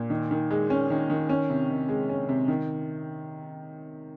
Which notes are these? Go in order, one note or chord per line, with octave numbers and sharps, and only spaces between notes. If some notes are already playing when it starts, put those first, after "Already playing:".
Already playing: A#2
D#3
D#3
G#3
C#4
D#3
D#3
C#4
C3
D#3
G#3
C#4
C3
D#3